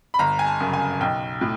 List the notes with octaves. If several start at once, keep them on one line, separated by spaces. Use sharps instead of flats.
B5
G1 A#5
G#5
A5
F#2 C#3
G#5
B1 G5
A2